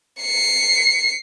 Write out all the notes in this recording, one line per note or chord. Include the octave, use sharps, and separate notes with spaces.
C7 C#7